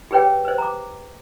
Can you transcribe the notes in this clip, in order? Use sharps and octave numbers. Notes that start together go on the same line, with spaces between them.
G4 G#4 B4 C#5 G5
B4 C5
A#5 D6